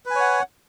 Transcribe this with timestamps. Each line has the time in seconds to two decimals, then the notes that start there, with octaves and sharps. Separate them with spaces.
0.06 B4
0.10 G#5
0.15 C#5
0.20 F#5